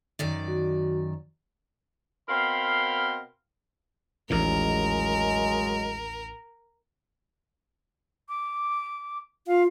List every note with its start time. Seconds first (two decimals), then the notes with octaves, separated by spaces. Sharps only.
0.19 F#2 D#3 D5
0.48 F#4
2.29 B2 C4 A#4 F5 B5 C6
4.30 A1 D#2 A#2 F#3 G#3 A#4
8.29 D6
9.47 F4 F5